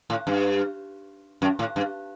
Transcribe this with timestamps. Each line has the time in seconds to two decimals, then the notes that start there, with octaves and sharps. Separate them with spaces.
0.10 A2
0.27 G2
1.42 F#2
1.59 A2
1.76 G2